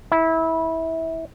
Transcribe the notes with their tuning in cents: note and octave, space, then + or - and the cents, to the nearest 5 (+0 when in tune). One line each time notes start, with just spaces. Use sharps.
E4 -20